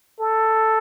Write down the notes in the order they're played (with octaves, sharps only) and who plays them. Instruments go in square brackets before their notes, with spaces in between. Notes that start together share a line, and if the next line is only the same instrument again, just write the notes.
[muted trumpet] A4